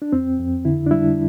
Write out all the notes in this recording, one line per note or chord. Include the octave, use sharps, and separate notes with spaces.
D4
F2 C4
F2
D3 E4
D4
G3 E4